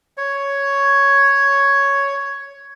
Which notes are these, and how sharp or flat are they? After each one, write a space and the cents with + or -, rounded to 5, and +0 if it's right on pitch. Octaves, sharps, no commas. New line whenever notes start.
C#5 +5